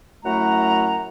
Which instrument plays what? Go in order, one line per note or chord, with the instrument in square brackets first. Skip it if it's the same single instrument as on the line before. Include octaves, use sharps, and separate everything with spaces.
[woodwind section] F#2 A3 E4 F#5 A#5